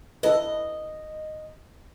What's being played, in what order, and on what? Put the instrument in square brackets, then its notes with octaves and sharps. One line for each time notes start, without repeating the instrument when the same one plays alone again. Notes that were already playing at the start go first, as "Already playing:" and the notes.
[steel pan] E4 A4 B4 [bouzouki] D#5